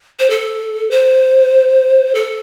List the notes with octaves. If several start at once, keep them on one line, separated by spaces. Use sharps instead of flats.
C5
A4
C5
A4